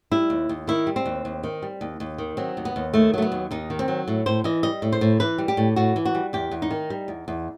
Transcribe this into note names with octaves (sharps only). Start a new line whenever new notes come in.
G3 E4
D#2
D#2
D#3 E4
G3
C4
D#2
D#2
D#3
G3
D#2
D#2
D#3
F#3 C4
D#2
B3
D#2
D#3 A3
F#3 A3
B3
D#2
D#2 D#4
D#3
C4
F#3
A2
A2 C5
E3 D#5
G3 D#5
A2
C5
A2
E3 B4
G3
G4
A2
A2 F#4
E3
F#4
G3
E2 G4
E2
D#4
D#3
G3
E2
E2